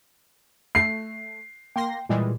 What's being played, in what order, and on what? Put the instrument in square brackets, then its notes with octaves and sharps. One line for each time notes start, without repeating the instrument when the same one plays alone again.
[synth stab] A3 [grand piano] C7
[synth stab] A#3 C6 A#6 [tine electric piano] G5
[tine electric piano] A#2 [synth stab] E3 G3 G#3